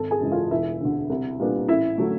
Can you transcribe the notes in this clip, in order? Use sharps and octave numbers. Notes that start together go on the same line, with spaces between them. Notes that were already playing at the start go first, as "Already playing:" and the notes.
Already playing: G#1 A4 A5
G#4 G#5
F#2 C#3 E3 G#3
F4 F5
E1 E4 E5
D2 D3
C2
A#2 G3 B3 D4
A1 E4 E5
D3 F#3 A3